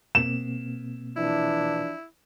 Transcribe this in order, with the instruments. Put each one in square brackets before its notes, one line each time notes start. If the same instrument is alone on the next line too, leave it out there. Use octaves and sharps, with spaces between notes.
[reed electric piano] B2 A#3 C4 [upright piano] E7
[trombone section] E3 F3 D4 [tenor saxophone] E4